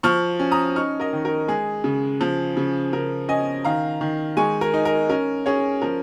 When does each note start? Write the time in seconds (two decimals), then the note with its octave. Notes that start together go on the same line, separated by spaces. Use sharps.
0.03 F3 C#6 F6
0.39 C#4
0.51 A#5 D#6
0.76 D#4 C#6 F6
1.00 A#4 D#5
1.13 D#3
1.25 A#4
1.48 G#3 G#4
1.84 C#3
2.21 F3
2.57 C#3
2.93 C#3 A#4
3.28 C#4 D#5 G#5
3.65 D#3 F5 A#5
4.01 D#3
4.37 G#3 G#5 C#6
4.61 A#4
4.74 D#4
4.85 A#4
5.09 C#4 A#4
5.46 C#4 G#4 C#5
5.82 F3 A#4